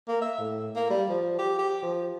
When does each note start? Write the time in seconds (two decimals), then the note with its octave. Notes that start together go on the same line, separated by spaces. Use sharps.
0.08 A#3
0.22 E5
0.38 A2
0.76 A#3
0.90 G3
1.09 F3
1.39 G4
1.59 G4
1.82 F3